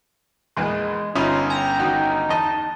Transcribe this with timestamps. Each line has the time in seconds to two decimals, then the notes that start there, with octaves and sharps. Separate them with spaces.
0.57 A#1 E2 G#3 B4
1.15 G1 C#4 D#4 F4 E5 B5 D#6
1.50 G5 G#5 A#5
1.79 D#3 D#4 F#4
2.29 E2 D#5 A5